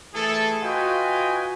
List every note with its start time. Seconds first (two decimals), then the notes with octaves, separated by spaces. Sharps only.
0.14 E3 A3 E4 G#4 A4
0.63 F4 F#4 B4 D#5 G5 G#5